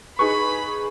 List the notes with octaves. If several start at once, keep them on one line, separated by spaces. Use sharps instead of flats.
D#4 G#4 B4 B5 C#6